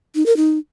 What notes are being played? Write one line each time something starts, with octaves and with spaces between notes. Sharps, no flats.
D#4
A#4
D#4